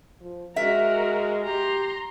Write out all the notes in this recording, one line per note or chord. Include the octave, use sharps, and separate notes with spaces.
F3
G#3 F#4 A#4 E5
G4 A#5 C6